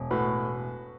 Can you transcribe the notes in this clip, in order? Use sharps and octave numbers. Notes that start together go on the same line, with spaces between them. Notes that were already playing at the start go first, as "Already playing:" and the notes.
Already playing: E1
A2 F#4 B4